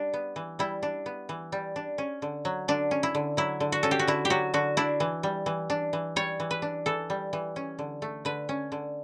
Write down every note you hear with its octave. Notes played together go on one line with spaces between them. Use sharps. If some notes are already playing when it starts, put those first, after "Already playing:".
Already playing: G3 D4
B3
E3
G3 E4
D4
B3
E3
G3
D4
C#4
D3
F#3
D3 D4
C#4
E4
D3
F#3 E4
D3
F#4
C#4 A4
G4
F#4
D3 E4
G4
F#3 F#4
D3 F#4
D4 E4
E3
G3
E3
D4
E3
G3 C#5
E3
B4
D4
E3 A4
G3
E3
C#4
D3
A3
D3 B4
C#4
D3